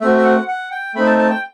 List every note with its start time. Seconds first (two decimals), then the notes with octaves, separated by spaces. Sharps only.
0.01 A3 C4 F#4 E5
0.18 E5
0.25 F#5
0.48 F#5
0.71 G5
0.95 A3 C4 D#4 B5
1.07 A5
1.18 A5
1.30 G5